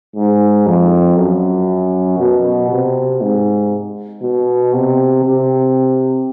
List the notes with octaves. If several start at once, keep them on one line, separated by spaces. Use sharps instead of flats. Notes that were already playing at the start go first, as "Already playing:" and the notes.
G#2
F2
F#2
B2
C3
G#2
B2
C3
C3